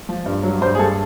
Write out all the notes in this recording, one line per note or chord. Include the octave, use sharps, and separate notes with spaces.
F3
G2
F#3
G2 C5
G#4
G2 A4